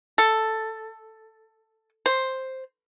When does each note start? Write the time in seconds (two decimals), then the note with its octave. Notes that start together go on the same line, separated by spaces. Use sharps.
0.18 A4
2.06 C5